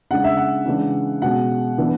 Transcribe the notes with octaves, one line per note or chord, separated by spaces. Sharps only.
C#3 G#3 D4 F#5
E5
F#5
C#3 E3 G#3 D4
B2 G#3 C#4 F#5
E3 B3 D4